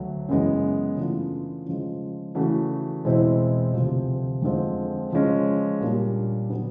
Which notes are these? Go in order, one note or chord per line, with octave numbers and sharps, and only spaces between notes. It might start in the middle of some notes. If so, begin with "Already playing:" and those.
Already playing: D2 F#3 A3
F#2 C#3 E3 G#3 B3
C#3 E3 A3 D4 F4
C#3 F3 G#3
C#3 E3 A3 C#4 F#4
E2 B2 G#3 C4 E4
D2 C3 F3
F2 D3 F3 G#3 C4
C#3 F3 G#3 C#4
A#2 G3 A#3 D4
D3 F#3 B3